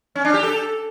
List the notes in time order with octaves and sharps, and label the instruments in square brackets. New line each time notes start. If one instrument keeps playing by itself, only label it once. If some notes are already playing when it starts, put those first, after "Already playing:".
[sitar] C#4
D4
G4
A4